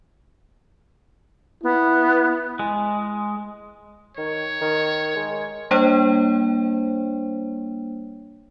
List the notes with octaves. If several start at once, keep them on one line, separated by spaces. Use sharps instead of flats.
B3 E4
G#3
D#3 C#5
D#3
G#3
G3 A#3 D4 C5 C#5 G5